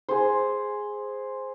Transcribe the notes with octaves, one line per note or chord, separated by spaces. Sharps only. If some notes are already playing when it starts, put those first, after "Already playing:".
G#4 C5